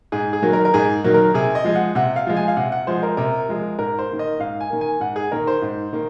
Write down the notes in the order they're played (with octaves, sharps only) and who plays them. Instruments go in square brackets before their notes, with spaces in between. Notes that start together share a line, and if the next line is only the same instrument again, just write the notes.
[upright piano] G#2 G#4
G#4
D#3 F#3 A#3
A#4
A#4
G#2 G#4
D#3 F#3 A#3
A#4
C3 G#4
D#5
F3 G#3
F#5
C3 F#5
F5
F3 G#3
G#5
F5
C3 F#5
F#5
F3 G#3 C5
A#4
C3 A#4
F3 G#3
G#2 A#4
C5
D#3 A#3
D#5
G#2 F5
G#5
D#3 A#3
G#5
G#2 F#5
G#4
D#3 A#3 A#4
C5
G#2
D#3 A#3